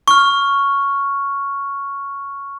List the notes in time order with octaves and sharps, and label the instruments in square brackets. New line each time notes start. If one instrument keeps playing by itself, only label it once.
[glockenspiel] C#6 F6